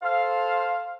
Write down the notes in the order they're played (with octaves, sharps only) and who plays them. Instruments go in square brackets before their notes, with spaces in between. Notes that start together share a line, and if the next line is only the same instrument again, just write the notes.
[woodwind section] A4 C5 F5